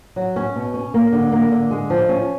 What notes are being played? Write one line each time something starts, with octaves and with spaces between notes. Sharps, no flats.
F#3
C#4
B2
C#4
A#3
D3
A#3
D3
G#3
F3
C#4